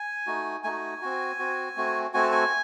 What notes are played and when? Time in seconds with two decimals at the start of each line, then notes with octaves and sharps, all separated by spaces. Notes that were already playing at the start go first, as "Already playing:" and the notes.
Already playing: G#5
0.27 A3 D#4 F#4
0.64 A3 D#4 F#4 G#5
1.02 C4 F#4
1.39 C4 F#4
1.77 A3 C4 F#4
2.14 A3 C4 F#4 G#5
2.22 A5
2.32 G#5